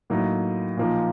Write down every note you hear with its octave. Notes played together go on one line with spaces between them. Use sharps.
A2 F#3 A#3 D#4
A#2 F3 A#3 D#4